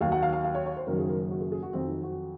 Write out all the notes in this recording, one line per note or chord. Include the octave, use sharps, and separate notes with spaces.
D#2 D#3 F#3 F5
F#5
F5
F5
F5
C#5
C#5
C5
F#1 F#2 D#3 F#3 A#4
G#4
A#4
F#4
G#4
G#4
F#4
F2 D#3 F#3 C4
D#4
F#4